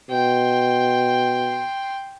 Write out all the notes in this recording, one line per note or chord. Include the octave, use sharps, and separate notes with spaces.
B2 G5 C6